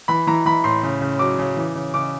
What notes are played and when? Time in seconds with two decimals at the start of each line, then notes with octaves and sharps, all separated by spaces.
0.08 E3 B5
0.27 E3 A#5
0.46 E3 B5
0.64 A2 C6
0.83 C#3
1.01 C#3
1.19 F#3 D6
1.39 C#3
1.57 E3
1.75 C#3
1.94 C#3 D6